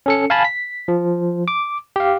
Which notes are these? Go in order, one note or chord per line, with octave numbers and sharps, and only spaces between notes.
C#4 A4 C#7
F5 G#5 A5 B5
B6
F3
D6
G4 F5